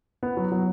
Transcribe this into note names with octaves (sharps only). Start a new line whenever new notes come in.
B3
F#3
F#3